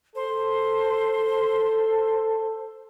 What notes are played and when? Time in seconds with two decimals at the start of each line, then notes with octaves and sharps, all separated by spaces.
0.15 A4 C5